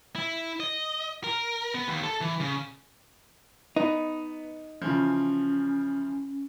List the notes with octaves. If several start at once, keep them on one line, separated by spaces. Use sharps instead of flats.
E4
D#5
A#4
B3
D#2
A4
E3
C#3
B3 D#4
C#3 E3 F3 C#4